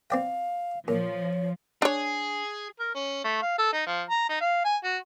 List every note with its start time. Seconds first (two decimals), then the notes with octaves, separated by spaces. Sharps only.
0.10 C4 D5 F5 G5
0.88 A#2 F3 C#5
1.82 D4 G#4 C#5
2.79 A#4
2.95 C#4
3.24 A3
3.42 F5
3.58 A4
3.73 D#4
3.86 F3
4.10 A#5
4.29 D#4
4.41 F5
4.65 G#5
4.84 F#4